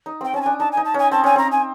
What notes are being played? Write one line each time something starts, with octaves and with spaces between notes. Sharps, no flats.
D#4
C4 G5
C#4 A5
D4 G#5
D#4 A5
G#5
D#4
A5
C#4 G#5
C4 A5
C#4 G#5
C4 A#5
G#5